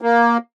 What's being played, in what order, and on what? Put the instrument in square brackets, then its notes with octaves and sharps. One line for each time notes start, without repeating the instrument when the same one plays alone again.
[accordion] A#3